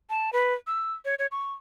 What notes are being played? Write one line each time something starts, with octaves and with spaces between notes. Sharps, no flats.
A5
B4
E6
C#5
C#5
C#6